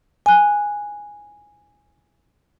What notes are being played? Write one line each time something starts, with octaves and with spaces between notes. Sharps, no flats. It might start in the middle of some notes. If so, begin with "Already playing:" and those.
G#5 F#6